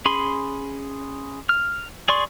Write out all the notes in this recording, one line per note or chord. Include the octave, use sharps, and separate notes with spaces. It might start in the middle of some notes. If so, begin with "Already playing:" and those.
C#4 G#4 B5 C6
F6
G#4 D5 C6 C#6